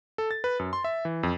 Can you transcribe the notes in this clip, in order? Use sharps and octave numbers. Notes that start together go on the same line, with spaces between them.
A4
A6
B4
F#2
C6
E5
E3
F2